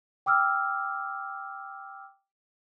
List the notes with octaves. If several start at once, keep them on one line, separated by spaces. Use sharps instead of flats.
G5 D6 E6 F6